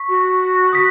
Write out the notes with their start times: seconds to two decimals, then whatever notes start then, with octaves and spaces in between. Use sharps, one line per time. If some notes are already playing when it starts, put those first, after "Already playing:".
Already playing: C#6 B6
0.09 F#4
0.73 D#6 B6